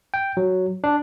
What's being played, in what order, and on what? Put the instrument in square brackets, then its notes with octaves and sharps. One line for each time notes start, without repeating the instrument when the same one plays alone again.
[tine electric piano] G5
F#3
D4